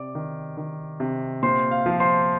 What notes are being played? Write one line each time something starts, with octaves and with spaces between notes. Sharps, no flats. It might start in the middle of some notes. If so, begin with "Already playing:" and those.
Already playing: C3 D5 D6
D#3
D#3
C3
A#2 C5 C6
F5
F3
C5 C6